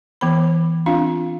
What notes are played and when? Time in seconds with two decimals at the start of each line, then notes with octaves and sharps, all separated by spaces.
0.21 E3 B3 C5 B5
0.86 C4 D4 F4 F5